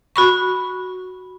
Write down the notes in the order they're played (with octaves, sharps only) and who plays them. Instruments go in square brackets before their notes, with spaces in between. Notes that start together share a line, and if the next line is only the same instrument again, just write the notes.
[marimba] F#4 B5 C#6